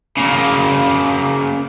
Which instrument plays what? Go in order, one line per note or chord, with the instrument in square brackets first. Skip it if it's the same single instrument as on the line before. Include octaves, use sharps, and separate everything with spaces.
[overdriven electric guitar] C#3 A#3